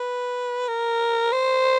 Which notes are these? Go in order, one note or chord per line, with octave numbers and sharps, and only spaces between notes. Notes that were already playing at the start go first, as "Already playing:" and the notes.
Already playing: B4
A#4
C5